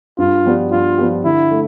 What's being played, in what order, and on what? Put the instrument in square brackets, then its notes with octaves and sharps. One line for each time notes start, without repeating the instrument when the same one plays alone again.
[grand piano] G2 [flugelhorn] F4
[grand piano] F3 B3 D4 G4
[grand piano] G2 [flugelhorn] F4
[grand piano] F3 B3 D4 G4
[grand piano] D3 [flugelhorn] E4
[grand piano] A3